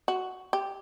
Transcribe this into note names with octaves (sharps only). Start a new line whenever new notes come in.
F#4
G4